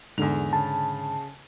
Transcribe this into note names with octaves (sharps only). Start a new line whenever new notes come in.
E2 G#2 D3 F7
C#3 A5